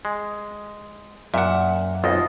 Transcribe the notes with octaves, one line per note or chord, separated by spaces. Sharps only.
G#3
F#2 A#2 E5 F#5
B1 F2 F4 D#5